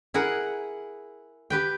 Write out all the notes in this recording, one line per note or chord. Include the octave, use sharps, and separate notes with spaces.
E4 G#4 A#4 F#5
G4 B4 G5